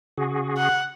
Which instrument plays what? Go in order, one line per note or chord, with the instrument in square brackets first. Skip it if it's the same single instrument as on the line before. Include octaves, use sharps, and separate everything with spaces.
[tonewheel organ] C#3 F#4 G#4
[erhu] F#5